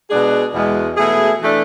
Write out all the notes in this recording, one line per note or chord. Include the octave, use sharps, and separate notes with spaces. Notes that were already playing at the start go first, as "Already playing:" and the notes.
B2 G#3 D4 G#4
E2 B2 G#3
B2 A3 E4 G#4
E3 A3 D4